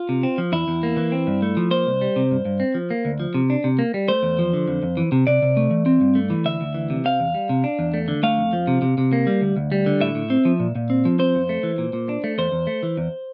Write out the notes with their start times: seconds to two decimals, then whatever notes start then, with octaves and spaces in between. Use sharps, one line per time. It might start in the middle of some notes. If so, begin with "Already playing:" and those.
Already playing: F4
0.09 C3
0.23 C4
0.38 F3
0.52 E2 E4
0.68 E2
0.83 A#3
0.97 E3
1.12 C4
1.27 G2
1.42 A3
1.57 F3
1.71 A#3 C5
1.87 C2
2.01 G3
2.16 C3
2.31 G2
2.45 G2
2.60 C4
2.75 F3
2.91 A#3
3.05 D2
3.20 F3
3.34 C3
3.50 D4
3.64 C3
3.79 A#3
3.94 G3
4.08 A3 C5
4.23 E2
4.39 F3
4.53 D3
4.68 F2
4.83 F2
4.97 E3
5.12 C3
5.27 C3 D5
5.42 C3
5.57 A3
5.71 E3
5.86 C4
6.01 G2
6.15 A3
6.30 E3
6.45 D2 E5
6.61 D2
6.74 E3
6.90 C3
7.05 C4 F5
7.20 E2
7.34 G3
7.49 C3
7.64 D4
7.79 E2
7.94 A3
8.08 D3
8.23 A3 F5
8.37 F2
8.53 F3
8.67 C3
8.82 C3
8.98 C3
9.13 A#3
9.27 G3
9.41 D2
9.57 D2
9.72 G3
9.86 D3
10.01 A2 E5
10.15 A2
10.30 C4
10.45 F3
10.60 A#2
10.75 A#2
10.90 C4
11.05 F3
11.19 C4 C5
11.35 F2
11.49 A3
11.63 E3
11.78 A#2
11.93 A#2
12.09 D4
12.24 A3
12.38 E2 C5
12.52 E2
12.67 A3
12.83 E3
12.97 E2